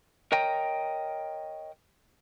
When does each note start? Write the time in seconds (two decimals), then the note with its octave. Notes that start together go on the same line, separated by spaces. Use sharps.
0.32 A#4 C#5 D#5 G5 A#5